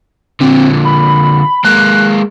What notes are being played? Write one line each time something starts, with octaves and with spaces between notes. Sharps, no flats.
A#2 D3 C4
B5
G#3 A#3 F#6